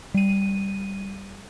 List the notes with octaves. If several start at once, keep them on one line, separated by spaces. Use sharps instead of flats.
G3 D#7